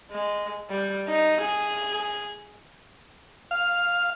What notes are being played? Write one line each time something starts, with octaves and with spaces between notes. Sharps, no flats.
G#3
G3
D#4
G#4
F5